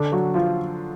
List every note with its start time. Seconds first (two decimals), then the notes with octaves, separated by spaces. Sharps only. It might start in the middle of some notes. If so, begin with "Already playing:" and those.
Already playing: D3 D4
0.12 F#3 F#4
0.34 F3 F4